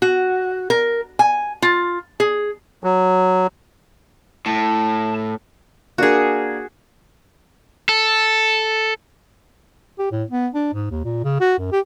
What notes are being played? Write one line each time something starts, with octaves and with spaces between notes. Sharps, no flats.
F#4
A#4
G#5
F4
G#4
F#3
A2 A5
A#3 D4 F#4 G#4 A#4
A4
G4
A2
B3
D4
G#2
D#2
A#2
C#3
F#4
F#2
G4